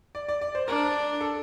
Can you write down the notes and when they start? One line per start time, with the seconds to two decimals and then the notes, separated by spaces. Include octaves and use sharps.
0.15 D5
0.28 D5
0.41 D5
0.55 C5
0.68 D4 A#4
1.21 A4